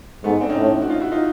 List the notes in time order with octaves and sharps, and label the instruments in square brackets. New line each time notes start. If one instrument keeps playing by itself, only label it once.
[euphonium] G#2 [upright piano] A3 B3
[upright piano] C4 D4
C#4 D#4
[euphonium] A2
[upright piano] F#4
D#4 F4
E4 F#4
D#4 F4